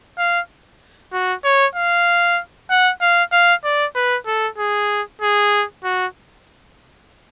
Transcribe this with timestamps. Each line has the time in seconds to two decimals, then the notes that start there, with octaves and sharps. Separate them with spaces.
0.18 F5
1.13 F#4
1.44 C#5
1.75 F5
2.70 F#5
3.01 F5
3.32 F5
3.64 D5
3.96 B4
4.27 A4
4.58 G#4
5.21 G#4
5.84 F#4